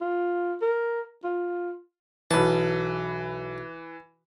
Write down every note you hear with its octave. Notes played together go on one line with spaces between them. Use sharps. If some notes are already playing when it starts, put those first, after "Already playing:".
F4
A#4
F4
B1 E3 B4 A5